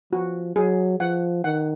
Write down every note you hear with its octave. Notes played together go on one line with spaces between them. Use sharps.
F3 F#4
F#3 G#4
F3 F#5
D#3 F#5